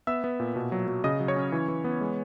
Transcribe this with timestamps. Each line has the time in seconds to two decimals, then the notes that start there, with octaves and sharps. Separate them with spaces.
0.07 B3 E5 E6
0.24 B3
0.40 A#2
0.56 B2
0.72 F#3
0.88 F#3
1.04 C#3 D#5 D#6
1.20 F#3
1.28 C#5 C#6
1.36 C#4
1.52 E3
1.68 E3
1.84 B3
2.01 G#3